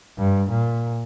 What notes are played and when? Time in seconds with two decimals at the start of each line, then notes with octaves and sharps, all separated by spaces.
0.18 G2
0.50 A#2